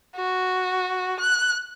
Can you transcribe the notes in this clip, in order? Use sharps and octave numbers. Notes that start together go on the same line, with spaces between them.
F#4
F#6